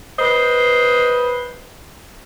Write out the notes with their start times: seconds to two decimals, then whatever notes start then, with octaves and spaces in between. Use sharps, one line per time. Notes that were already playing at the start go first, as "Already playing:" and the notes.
0.19 B4 C5 D#5